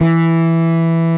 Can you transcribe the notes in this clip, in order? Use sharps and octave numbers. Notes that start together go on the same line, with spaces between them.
E3